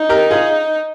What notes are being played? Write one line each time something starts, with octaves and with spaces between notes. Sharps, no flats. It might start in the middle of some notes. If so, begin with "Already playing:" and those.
Already playing: D#4
G4 A#4
F4 G#4